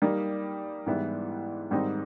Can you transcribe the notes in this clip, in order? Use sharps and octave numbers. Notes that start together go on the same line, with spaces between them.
G3 A#3 D#4
G#2 E3 G3 B3 E4
G#2 D#3 G3 C4 D#4